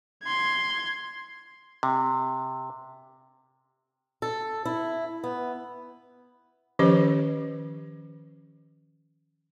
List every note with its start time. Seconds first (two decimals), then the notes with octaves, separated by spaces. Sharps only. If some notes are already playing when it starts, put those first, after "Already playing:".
0.23 C6 G#6
1.83 C3
4.22 A4
4.65 E4
5.24 B3
6.79 D#3 F3 C#4 G4 B4 C5